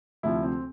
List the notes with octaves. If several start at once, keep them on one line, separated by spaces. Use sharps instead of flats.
D2 C3 F3 E4
C4